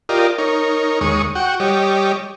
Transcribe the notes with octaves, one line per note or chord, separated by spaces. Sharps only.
F4 G4 A#4 D5 D#5
D#4 A#4 C#5
D#2 G#3 C#5 C#6 D#6
F#4 F#5 G5 C#6
G3 G4 C#5 D#5